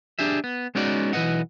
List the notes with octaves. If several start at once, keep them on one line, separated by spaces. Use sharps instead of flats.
D4 G4 G#4 E5
B3
G#3 B3 C#4 D#4 F#4 D5
B1 E3 B3 B4 D#5 F#5